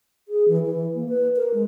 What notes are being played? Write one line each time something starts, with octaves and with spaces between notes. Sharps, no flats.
G#4
E3
E3
A#3
B4
A#4
G#3